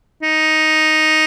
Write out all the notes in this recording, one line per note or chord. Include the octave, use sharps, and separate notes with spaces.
D#4